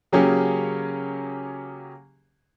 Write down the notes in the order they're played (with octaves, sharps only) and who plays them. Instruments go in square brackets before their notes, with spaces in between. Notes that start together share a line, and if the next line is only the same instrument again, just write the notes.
[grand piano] C#3 F#3 A#3 C#4 G4 G#4